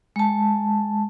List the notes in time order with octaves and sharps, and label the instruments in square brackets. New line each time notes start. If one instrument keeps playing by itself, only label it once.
[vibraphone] G#3 A5